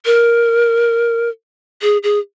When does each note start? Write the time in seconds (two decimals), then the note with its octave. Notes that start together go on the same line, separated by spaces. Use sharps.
0.05 A#4
1.82 G#4
2.03 G#4